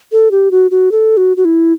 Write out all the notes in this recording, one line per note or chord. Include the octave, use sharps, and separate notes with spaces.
A4
G4
F#4
F#4
A4
F#4
F#4
E4